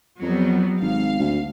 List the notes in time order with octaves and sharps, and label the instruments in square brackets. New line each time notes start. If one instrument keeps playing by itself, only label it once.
[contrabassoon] F2 [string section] F#3 G3 B3
[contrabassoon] G#1 [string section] F5
[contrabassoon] D2